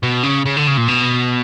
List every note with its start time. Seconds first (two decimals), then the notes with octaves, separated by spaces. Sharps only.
0.03 B2
0.23 C#3
0.46 C#3
0.57 D3
0.67 C#3
0.78 A#2
0.88 B2